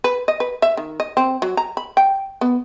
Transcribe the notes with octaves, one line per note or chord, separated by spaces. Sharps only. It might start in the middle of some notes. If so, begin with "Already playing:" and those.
B4
D#5
B4
E5
D#3
D#5
C4
F#3
A#5
B5
G5
B3